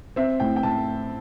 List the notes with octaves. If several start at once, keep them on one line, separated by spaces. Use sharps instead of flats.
C4 E5
A2 G5
G5
A2 A5